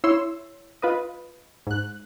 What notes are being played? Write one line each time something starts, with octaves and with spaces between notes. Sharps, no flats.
E4 C#5 C6 E6
F4 B4 D#5
G#2 F#6